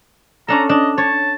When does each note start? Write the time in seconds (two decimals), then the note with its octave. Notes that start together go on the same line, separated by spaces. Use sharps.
0.48 C#4 D4 A4 A#5
0.69 D4 D#5
0.98 C#5 A5